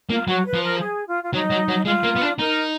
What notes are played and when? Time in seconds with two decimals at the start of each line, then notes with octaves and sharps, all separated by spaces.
0.10 A#3 F4
0.28 F#3 F#4
0.45 B4
0.54 F3
0.63 A#4
0.80 G#4
1.07 F4
1.23 F4
1.33 F#3 D#4
1.50 F#3
1.68 F#3
1.85 G#3 F4
2.03 A#3
2.16 B3
2.21 D4
2.39 D#4 A#4